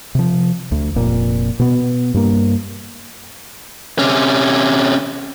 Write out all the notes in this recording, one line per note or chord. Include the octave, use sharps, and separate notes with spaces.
C3 F3
D2
F1 A#2
B2 B3
G2 A#3
C3 C#4